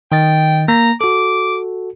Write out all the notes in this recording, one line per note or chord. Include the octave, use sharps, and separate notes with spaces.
D#3 D#5 G5 A6
A#3 A#5
F#4 A4 D6